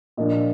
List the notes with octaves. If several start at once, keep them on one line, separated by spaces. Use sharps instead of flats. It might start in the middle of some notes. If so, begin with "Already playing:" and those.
A#2 F3 A#3 D4 D#5